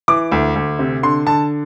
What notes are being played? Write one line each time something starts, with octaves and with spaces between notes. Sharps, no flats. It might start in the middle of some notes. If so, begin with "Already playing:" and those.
E3 D6
D2
D2
C3
D3 C6
D3 A5